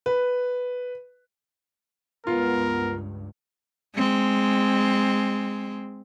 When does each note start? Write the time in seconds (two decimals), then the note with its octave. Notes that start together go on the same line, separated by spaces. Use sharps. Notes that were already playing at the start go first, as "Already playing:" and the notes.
0.06 B4
2.27 C#2 G2 B3 F4 A#4
3.95 G#3 C4